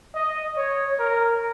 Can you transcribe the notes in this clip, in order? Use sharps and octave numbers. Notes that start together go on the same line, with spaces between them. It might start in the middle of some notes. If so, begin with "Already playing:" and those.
D#5
C#5
A#4